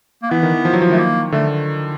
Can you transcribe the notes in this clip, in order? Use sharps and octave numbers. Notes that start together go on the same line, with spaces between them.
A#3
E3 B3
D#3
E3
F3
F#3
F3
D#3 A3
A#3
D3 A3